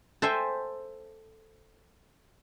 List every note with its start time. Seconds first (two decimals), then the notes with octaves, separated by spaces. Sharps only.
0.22 A4 C5 E5 G5 G#5